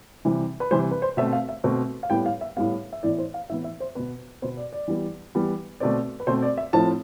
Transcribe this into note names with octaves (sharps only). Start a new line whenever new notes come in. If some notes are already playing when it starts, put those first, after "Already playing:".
C3 E3 G3
B4
C3 E3 G3 C5
B4
C5
B2 A3 C4 E5
F5
E5
B2 A3 C4
F5
A2 G3 B3 G5
F5
E5
A2 G3 B3 F5
E5
A2 E3 B3 D5
C5
F5
A2 E3 B3 E5
E5
C5
B2 B3 B4
B2 B3 C5
D5
D5
E3 G3 B3
E3 G3 B3
B2 A3 C4 D5
B4
B2 A3 C4 C5
D5
E5
A2 F3 A3 C4 A5